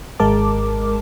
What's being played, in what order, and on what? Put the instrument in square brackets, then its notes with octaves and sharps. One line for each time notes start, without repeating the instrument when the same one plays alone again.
[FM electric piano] G#1 G#3 A#4 A5 D6